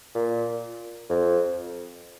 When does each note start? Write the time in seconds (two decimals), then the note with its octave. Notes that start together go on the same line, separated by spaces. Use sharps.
0.15 A#2
1.09 F2